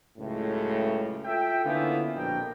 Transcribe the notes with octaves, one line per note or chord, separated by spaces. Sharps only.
C#2 F#2 A2
F4 A4 E5 G5
D3 A#3 B3 C#4 E4 F4
A#1 F2 B2 D4 A#4 G5